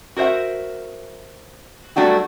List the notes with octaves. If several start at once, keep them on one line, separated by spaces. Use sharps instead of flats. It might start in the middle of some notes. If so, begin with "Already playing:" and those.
F#4 A#4 C5 E5 F#5
F#3 G3 A3 D4 F#4 G4